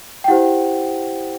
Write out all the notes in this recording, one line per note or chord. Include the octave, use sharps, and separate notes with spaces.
G5
E4 G4 C5 F#5